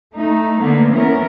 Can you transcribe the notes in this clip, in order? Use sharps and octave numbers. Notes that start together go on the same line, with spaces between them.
A3 D#4
D3 A#3 B3
E3 B3 C#4 A#4